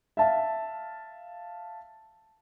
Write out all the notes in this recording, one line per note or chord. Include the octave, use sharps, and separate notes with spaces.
E5 F5 A5